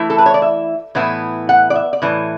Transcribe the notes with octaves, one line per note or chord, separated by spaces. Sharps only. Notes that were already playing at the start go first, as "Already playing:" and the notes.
Already playing: E3 A3 E4 E5
A4
B4
C#5
D5
E5
A2 E3 B3 E4
F#5
D5
E5
D5
A2 E3